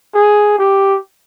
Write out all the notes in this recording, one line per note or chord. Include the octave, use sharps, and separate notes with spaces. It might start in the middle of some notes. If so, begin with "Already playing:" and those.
G#4
G4